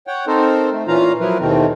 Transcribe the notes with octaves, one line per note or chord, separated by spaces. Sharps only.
C#5 F#5 G5
C4 D#4 A4 A#4 C5
A3
A#2 E3 C#4 F4 F5 A#5
F3 F#3 E4 A#4 B4
D#2 B2 D#3 E3 A3 C4